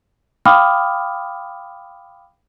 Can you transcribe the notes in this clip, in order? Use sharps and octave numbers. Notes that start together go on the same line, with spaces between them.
F5 G5 B5 D6 D#6 F6